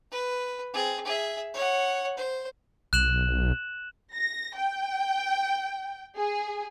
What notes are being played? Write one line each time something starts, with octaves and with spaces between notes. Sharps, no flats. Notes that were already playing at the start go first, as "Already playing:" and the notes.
B4
C4 G#4
G#4 E5
C#5 F#5
C5
B1 F#6 E7 F#7
A#6
G5
G#4